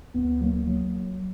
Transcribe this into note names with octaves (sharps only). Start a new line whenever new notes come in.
D2 B3
F#3 A#3
F#3